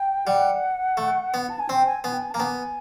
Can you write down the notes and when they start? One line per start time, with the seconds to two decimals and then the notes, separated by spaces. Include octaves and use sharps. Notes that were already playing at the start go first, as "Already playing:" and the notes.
Already playing: G5
0.26 G3 F#5
0.97 A3
1.34 B3
1.50 A5
1.59 G#5
1.69 C4 G5
1.86 G#5
2.04 B3 G#5
2.13 G5
2.22 G#5
2.31 A#3 A5
2.40 B3 G#5